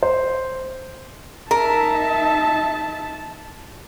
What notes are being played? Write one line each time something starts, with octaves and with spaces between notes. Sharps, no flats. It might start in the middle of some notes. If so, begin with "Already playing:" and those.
C5
D#4 A#4 E5 A5